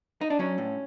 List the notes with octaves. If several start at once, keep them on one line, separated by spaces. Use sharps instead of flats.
D#4
D4
F#3 C#4
A2